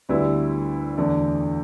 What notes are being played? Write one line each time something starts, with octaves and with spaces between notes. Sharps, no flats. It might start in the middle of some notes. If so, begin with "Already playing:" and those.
D2 D3 G3 B3 E4
E2 D3 A3 D4